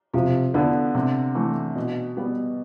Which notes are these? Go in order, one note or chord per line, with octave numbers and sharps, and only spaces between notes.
C3 F3
D3 B3 E4
C3
E3 A3
B2
G3 B3